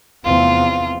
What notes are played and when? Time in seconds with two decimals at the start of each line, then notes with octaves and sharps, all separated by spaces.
0.24 F1 E2 C4 F4